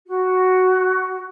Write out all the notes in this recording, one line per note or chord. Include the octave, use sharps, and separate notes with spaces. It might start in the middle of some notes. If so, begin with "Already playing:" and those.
F#4